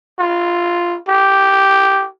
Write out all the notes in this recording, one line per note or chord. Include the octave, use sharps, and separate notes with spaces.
F4
G4